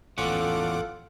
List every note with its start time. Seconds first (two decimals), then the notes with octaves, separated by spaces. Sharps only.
0.18 A1 E2 C#4 F4 A4 F#5 D6